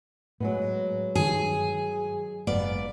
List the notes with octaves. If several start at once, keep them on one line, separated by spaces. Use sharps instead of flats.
A2 F#3 G#3 B3
G2 D#3 G#4
F#1 G#2 B3 D5 F5